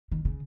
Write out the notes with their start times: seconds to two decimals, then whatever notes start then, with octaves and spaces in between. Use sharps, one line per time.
0.12 D#3
0.25 C#3